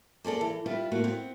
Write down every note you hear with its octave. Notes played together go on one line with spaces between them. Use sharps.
A#3 G#4 A4 D5
E3
G3 E4 F4 B4
A2 A#3 F#4
B3 C4